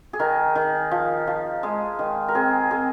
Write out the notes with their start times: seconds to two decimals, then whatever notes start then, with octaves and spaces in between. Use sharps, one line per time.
0.13 G#4
0.19 D#3 A#4
0.55 D#3
0.91 F3
1.27 F3
1.63 G#3 G#4
1.99 D#3
2.28 A#4
2.35 C4 G#4
2.71 C4 G#4